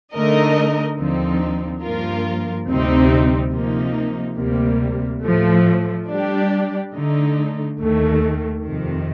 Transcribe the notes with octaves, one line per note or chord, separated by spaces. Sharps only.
D3 A3 D#4 A#4 D#5
D#2 D3 F3 C4 D#4
G2 F3 A#3 F4 A#4
D2 C3 G3 C4 D#4
C3 F3 A#3 D#4
D2 C3 G3 A#3
A2 F3 A3
G3 D4 G4 D5
D3 A3 D#4
D#2 D#3 A3
F2 C3 D#3